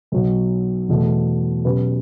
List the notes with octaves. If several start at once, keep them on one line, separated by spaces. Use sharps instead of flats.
B1 B2 F#3
E2 B2 A3
B2 F#3 C#4 G4 B4